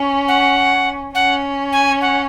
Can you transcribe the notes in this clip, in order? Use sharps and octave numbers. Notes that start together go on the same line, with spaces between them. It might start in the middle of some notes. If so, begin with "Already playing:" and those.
Already playing: C#4
F#5
C#4 F#5
G#5
F#5